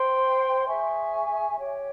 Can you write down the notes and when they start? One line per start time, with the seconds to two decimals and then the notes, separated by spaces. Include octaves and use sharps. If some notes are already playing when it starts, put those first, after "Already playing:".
Already playing: C5 G5 C6
0.68 G#4 E5 G#5 C#6
1.58 G4 C#5 G5